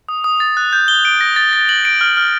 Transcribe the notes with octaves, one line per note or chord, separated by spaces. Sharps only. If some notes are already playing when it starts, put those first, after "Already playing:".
D#6
D#6
A6
F#6
G6
G7
D7
A#6
A6
A6
F#7
D7
F6
F6